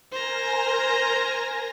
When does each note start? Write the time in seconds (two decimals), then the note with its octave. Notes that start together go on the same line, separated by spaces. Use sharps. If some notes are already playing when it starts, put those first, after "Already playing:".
0.12 A#4 C5 G#5 A#5 A#6